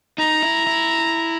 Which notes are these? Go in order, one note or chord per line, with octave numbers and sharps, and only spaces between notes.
D#4 A#5
E4
E4